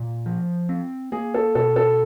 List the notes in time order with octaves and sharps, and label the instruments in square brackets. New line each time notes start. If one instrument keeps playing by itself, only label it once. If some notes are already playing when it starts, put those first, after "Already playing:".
Already playing: [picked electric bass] A#2
F3
C4
[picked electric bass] A#3 [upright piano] G#4
[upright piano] A4
[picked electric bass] B2 [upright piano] A4
[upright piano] A4